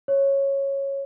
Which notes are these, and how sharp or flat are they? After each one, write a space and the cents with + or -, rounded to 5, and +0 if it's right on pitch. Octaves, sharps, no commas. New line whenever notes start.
C#5 -10